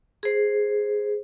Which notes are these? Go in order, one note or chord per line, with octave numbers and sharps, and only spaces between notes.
G#4 C5